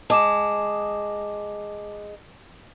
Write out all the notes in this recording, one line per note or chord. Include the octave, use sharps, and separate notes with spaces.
G#3 A5 D6 E7